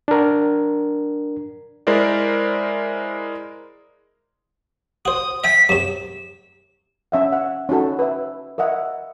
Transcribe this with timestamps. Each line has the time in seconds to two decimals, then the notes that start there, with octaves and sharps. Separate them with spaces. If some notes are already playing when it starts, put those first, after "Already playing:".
0.08 D4 A#4
1.87 G#3 E4 A#4 C5 D5
5.05 F#4 C5 D#6
5.44 E5 G5 G#5 B6
5.69 F#2 C3 E7
7.12 C#4 E5 F#5
7.33 F#5
7.69 C#4 D#4 F#4 A4
7.99 B4 E5
8.58 A#4 D#5 E5 F#5